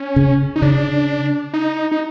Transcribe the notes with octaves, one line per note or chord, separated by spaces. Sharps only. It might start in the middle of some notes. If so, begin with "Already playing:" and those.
Already playing: C#4
C#3
D#4
C#3 D4
D#4
D#4